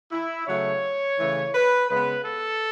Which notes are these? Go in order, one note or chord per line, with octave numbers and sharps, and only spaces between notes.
E4
C#3 F#3 A3 C#5
C#3 E3 A3
B4
C#3 G#3 B3 B4
A4